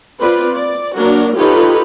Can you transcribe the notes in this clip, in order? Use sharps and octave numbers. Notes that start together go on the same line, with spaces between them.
C4 F4 B4 D5
D5
F#3 A#3 D4 F#4 A#4
D#4 F4 G4 A4 B4 C#5